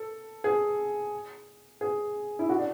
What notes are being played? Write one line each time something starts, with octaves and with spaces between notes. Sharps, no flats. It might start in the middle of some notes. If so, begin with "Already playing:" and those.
Already playing: A4
G#4
G#4
E4
F#4
D4